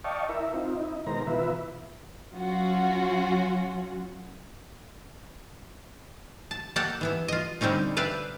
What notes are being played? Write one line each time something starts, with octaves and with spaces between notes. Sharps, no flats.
D5 D#5 F5 G5 A5 C#6
E4 A#4 E5
C4 D#4 F4
D#4 E4
B2 D#3 G#3 A#4 C5 A#5
B2 E3 F4 B4 E5
F#3 C#4 F4 F#4
A5
A#3 G4 A4 F#5 A5
E3 B3 E4
F4 D#5
D3 G3 C4 C#4 D#4
G4 B4 D5 E5 F5